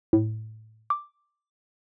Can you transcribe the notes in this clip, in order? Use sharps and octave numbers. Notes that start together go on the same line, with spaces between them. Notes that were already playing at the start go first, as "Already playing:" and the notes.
A2
D6